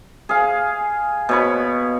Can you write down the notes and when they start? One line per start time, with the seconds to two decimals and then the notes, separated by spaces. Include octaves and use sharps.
0.29 G#4 F5
1.29 B2 C#5 B5